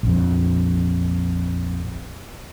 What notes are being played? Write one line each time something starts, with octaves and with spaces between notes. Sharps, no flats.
A#1 F2